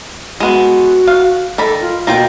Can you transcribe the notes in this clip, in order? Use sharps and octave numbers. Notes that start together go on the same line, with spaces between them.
G#3 B3 F#4
F5
D#3 A4 D5 B5
F4
B2 A#3 F4 G5